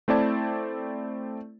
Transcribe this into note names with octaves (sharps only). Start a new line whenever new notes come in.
A3 C4 E4 D5 A5 G#6